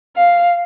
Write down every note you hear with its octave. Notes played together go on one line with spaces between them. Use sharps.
F5